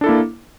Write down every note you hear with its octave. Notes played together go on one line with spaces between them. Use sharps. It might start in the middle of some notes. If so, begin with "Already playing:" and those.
A#3 D4 E4 A4